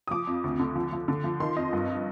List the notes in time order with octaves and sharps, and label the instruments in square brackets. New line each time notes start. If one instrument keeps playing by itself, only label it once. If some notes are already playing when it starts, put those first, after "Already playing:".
[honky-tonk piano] D#6
F3 D6
F2
D2
D3
F3
F3
D3
F3
D#3 C6
F2 D#5
G2